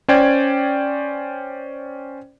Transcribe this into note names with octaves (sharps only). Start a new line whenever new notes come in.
C#4 C5 D5 G5 G#6